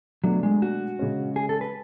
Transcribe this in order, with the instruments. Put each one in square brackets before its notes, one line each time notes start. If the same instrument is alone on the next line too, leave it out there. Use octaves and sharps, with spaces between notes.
[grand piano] B2 A3 D4 [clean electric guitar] F#3
[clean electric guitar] G#3
F#4
[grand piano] C#3 G#3 C#4
[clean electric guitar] G#4
A4
B4